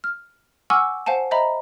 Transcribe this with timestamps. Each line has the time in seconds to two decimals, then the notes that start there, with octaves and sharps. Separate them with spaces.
0.04 F6
0.70 F#5 G#5 C#6 D6 E6 F6
1.06 C5 F5 F#5 G#5 A5
1.31 C5 D#5 E5 A#5 B5